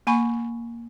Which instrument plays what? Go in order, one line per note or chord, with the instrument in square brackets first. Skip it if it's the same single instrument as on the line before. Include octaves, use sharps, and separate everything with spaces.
[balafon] A#3 G#5 B5 C#6